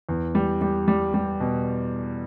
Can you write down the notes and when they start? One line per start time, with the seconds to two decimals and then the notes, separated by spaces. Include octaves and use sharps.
0.09 E2
0.35 G3
0.61 G3
0.88 G3
1.14 G3
1.40 B2